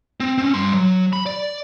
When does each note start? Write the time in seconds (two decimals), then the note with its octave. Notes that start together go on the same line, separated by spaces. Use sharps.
0.20 C4
0.38 C4 C#4
0.54 G2 C6
0.74 F#3
1.13 B5
1.26 D5